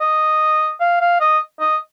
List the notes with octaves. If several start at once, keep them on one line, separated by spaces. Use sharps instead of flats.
D#5
F5
F5
D#5
D#5